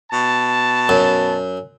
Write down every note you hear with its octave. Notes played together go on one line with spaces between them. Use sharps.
B2 A5
F#2